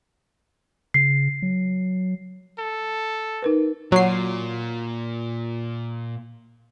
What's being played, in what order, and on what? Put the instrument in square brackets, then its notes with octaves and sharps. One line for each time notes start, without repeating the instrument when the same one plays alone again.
[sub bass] C#3 [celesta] C7
[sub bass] F#3
[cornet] A4
[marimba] D#4 A#4 B4
[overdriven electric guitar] A#2 [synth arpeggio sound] F#3 C7